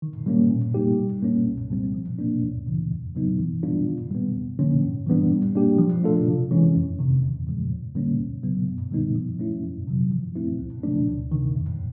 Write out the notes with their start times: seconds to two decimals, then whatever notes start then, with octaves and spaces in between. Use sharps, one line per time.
0.02 D#3
0.26 G3 A#3 C#4
0.50 A#2
0.74 G3 A#3 D#4 G4
0.98 G3
1.22 A#3 C#4
1.46 C2
1.70 B2 G3 C4
1.94 F3
2.19 A#3 D4
2.43 D2
2.67 C#3 E3
2.91 E2
3.15 C#3 F#3 B3 D#4
3.39 E3
3.63 G3 B3 D4 F4
3.87 D#3
4.11 G3 B3
4.35 D#2
4.59 D3 F3 A#3 C#4
4.83 G#2
5.07 E3 G3 B3 D4
5.31 G3
5.55 A#3 D4 G4
5.79 F3
6.03 A3 D4 F4 A4
6.27 C3
6.51 E3 G#3 C#4 E4
6.75 F2
6.99 C3 D#3
7.23 E2
7.47 C#3 F3 G#3
7.71 D#2
7.95 D3 G3 A#3 C#4
8.20 C#2
8.43 C#3 F#3 B3
8.67 F#2
8.91 D3 G3 B3 D#4
9.15 F3
9.39 A3 C#4 E4
9.63 F2
9.87 C3 D#3 F#3
10.12 F3
10.35 A3 C4 E4
10.59 C#2
10.83 C#3 F3 A3 D4
11.08 D2
11.31 C3 D#3
11.55 F2